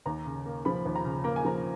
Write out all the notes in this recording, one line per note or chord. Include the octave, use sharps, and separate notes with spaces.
D#2 A#5
C#3
A#3
F3 B5
D#2
A#5
C#3
A#3 A#5
G#5
F3 A#5